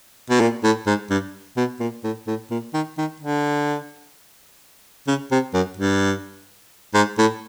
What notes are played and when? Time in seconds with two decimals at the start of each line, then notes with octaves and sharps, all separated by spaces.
0.30 B2
0.40 A#2
0.64 A2
0.86 G#2
1.10 G2
1.57 B2
1.80 A#2
2.04 A2
2.27 A2
2.51 A#2
2.74 D#3
2.98 D#3
3.20 D3
5.07 C#3
5.31 C3
5.54 F#2
5.77 G2
6.94 G#2
7.18 A2